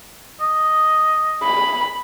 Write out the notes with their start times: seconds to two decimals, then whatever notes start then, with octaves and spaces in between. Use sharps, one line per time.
0.41 D#5
1.43 B5